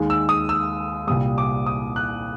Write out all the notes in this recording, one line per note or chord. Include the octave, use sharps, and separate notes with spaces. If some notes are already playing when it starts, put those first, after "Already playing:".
Already playing: D#2 D#3 G#3
E6
D#6
E6
C2 A#2 G3 D#6
D6
D#6
F#6